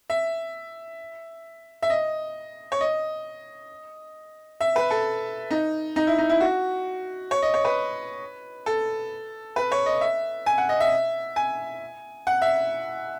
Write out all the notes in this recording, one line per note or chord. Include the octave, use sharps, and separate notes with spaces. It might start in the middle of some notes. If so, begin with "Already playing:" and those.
E5
E5
D#5
C#5
D#5
E5
B4
A4
D#4
D#4
E4
D#4
E4
F#4
C#5
D#5
C#5
B4
A4
B4
C#5
D#5
E5
G#5
F#5
D#5
E5
G#5
F#5
E5